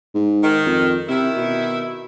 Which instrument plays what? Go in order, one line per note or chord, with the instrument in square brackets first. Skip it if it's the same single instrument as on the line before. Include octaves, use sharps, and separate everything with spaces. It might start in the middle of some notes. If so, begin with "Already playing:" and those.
[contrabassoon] G#2
[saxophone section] D#3
[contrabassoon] F2
[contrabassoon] C3 [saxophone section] D#3 E4
[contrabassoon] B2